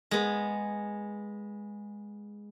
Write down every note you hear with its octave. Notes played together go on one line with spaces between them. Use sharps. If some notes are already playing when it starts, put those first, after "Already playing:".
G#3 B3